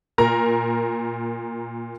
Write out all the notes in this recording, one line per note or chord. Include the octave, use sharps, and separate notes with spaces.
A#2 A#4 A#5